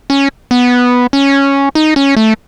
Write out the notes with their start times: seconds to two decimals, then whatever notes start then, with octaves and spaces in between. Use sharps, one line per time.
0.10 C#4
0.51 B3
1.13 C#4
1.75 D#4
1.96 C#4
2.17 A3